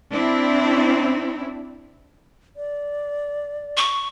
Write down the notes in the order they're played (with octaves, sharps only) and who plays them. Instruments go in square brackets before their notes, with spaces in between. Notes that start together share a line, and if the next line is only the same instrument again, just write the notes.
[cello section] C4 D4 E4
[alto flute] D5
[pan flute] C#6